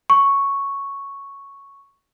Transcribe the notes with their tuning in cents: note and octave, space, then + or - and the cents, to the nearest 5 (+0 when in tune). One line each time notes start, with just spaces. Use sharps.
C#6 +0